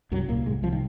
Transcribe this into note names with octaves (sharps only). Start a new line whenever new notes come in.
C2 F#2 F#3
C2 A#2 A#3
C2 G#2 G#3
C2 F3
D#3